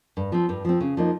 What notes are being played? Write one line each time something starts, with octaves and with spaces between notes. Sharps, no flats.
G2
F3 C4
G2
F3 C4
C#3
F3 A#3 D#4